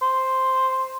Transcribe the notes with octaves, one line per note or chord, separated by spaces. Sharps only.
C5